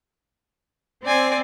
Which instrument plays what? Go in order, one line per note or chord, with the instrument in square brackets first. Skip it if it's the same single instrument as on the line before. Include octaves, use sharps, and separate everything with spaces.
[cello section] C4 [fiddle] D5 G#5